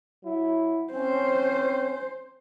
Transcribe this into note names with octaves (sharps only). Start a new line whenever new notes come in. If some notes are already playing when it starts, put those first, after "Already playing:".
F#3 E4
C4 C#4 C5